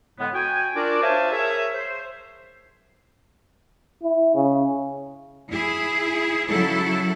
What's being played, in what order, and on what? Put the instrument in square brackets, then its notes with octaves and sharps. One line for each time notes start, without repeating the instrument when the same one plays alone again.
[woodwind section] A2 D3 G#3 B3
F#4 G5 G#5
D4 F4 F#4 A#4 D5
C5 C#5 E5 F5 G#5 A5
G#4 A#4 C#5 E5
C5
[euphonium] E4
C#3
[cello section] E4 G#4
C#3 F#3 E4 A4